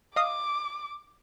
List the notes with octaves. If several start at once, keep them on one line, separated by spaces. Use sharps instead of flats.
D#5 F5 D6 D#6